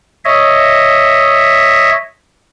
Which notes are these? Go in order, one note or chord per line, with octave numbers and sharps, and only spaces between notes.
C#5 D#5 E5